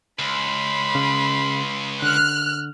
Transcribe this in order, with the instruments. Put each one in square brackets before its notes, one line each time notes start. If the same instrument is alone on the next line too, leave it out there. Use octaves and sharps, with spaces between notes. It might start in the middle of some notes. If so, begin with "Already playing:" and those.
[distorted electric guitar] C#2 [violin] B5 C6
[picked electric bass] C#3
[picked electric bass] D3 [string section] F6 F#6